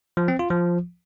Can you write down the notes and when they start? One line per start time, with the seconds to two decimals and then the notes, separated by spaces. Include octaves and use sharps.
0.17 F3
0.28 C4
0.39 F4
0.51 F3